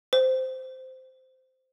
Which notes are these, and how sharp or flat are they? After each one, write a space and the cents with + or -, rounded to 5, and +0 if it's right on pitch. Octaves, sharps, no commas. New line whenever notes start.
C5 -10